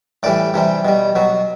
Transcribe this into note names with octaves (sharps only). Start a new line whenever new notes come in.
A2 E3 G3 D5
C3 E3 G3
B2 G3
B2 F#3